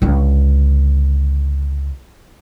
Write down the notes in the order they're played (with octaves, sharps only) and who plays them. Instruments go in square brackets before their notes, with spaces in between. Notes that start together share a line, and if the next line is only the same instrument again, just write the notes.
[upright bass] C#2 D3